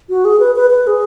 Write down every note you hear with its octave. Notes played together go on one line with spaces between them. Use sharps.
F#4
G#4
B4
B4
B4
G#4